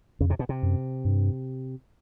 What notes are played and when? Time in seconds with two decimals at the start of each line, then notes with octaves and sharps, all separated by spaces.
0.21 F2 C#3
0.30 C3
0.39 B2
0.49 C3
0.63 F#2
1.05 G2